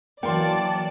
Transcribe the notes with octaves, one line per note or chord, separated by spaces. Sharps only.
E3 F#3 A#3 D5 G5 A5 C6